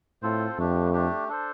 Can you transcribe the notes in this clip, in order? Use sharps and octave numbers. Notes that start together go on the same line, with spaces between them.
A2 C4 F4 A4 C5
F2 A3 D4 G4
A3 D4 G4
D4 A4 C5